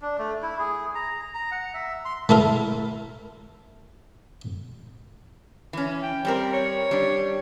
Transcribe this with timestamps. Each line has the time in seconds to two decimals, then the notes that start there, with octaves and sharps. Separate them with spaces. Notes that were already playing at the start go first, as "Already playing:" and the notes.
0.02 D4
0.18 A3
0.43 E4
0.59 G#4
0.95 A#5
1.34 A#5
1.52 F#5
1.74 E5
2.05 C6
2.29 A3 E4 A4 A#4
5.73 E3 C#4
6.02 G5
6.25 G3 C4 A#4
6.53 C#5
6.91 G3 D4